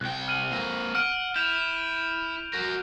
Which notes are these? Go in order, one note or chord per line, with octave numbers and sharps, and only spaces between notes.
C2 G5 F#6
F6 D#7 F#7
A#3 C4
F#5 F6 D7 D#7
E4 G6 E7 F7
F#4 A#4